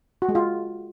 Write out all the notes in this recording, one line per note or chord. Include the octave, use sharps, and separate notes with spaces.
F#4
G#3
F4